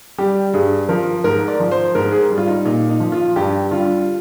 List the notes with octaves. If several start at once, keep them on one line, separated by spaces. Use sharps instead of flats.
G3 G4
G2 G#4
F3 A#4
G#2 A#4
D5
F3
C5
G#2 A#4
G#4
G3
F4
D#4
A#2 D#4
D#4
F3
F4
G2 G4
D3 G3 F4